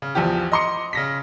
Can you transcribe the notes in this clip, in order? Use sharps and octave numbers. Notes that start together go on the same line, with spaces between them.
C#3
A#1 E2 F3 G4
D#5 A#5 C6 D6 C#7
C#3 A#6 B6